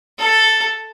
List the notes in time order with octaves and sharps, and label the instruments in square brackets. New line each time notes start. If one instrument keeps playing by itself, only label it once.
[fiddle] A4